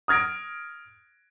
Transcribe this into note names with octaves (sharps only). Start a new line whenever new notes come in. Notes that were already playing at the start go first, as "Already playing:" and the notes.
D#6 F6 G#6 A#6 D7